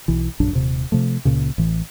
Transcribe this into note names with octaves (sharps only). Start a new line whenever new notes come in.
B1 E3
A#1 F#2 D4
D#1 C3
C3 F3 A3
C#2 A#2 C#3
A1 E3